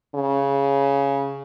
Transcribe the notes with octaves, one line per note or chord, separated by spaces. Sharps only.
C#3